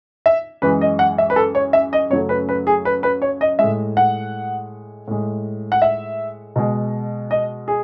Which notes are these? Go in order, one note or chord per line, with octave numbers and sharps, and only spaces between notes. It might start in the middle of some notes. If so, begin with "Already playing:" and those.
E5
F#2 E3 G#3 B4
D#5
F#5
E5
B4
A4
C#5
E5
D#5
F#2 C#3 F#3 A3 C#5
B4
B4
G#4
B4
B4
C#5
D#5
A2 G#3 E5
F#5
A2 G#3
F#5
E5
B2 G#3
D#5
G#4